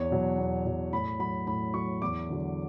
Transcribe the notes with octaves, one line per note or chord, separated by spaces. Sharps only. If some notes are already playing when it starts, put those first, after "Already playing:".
Already playing: E2 C#5
B2 F#3
E2
B2 F#3
A2 B5
F#3 B5
A2 B5
F#3 C#6
E2 D6
D3 F#3